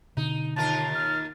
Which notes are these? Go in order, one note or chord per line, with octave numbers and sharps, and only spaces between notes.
B2 D3 D#4
D#2 F4 A#4 A5 A6
F6